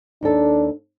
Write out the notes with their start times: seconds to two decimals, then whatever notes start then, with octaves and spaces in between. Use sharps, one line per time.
0.23 D#2 D4 A4